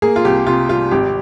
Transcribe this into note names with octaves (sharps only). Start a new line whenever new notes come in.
A#3 G#4
F4
C2 G4
C3 F4
G3 F4
G#1 G4